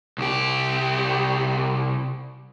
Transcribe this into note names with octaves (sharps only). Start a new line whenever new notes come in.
C2 G4